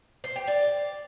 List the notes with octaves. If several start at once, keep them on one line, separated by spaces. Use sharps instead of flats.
C5
G4
D5